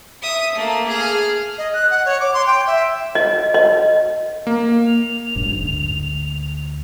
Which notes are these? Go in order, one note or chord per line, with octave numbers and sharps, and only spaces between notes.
E5 D#6
A3 A#3
G#4 F6
D#5
F#6
F#5
C#5
D6
C6
G5
E5
D#5
D#5
A#3
F7
F#1 G#2 D4
D2